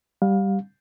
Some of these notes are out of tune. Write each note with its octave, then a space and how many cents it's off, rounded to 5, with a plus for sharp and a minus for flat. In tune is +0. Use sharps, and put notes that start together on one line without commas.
G3 +0 F5 +25